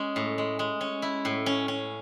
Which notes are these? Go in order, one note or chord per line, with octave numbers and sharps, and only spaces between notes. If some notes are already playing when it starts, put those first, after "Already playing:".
Already playing: G#3 C#4
A2
G#3
G#3
C#4
E4
A2
C#4
C#4